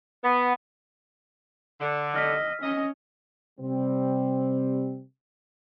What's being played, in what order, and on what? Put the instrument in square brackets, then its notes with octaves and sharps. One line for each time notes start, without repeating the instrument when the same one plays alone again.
[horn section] B3
D3
[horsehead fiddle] D#5 [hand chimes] E6 F6 B6
[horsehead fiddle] C#4 [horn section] D#5
[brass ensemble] C3 G3 C4